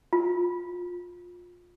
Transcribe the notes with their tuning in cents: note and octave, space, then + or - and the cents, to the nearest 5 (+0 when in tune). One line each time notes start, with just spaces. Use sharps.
F4 +20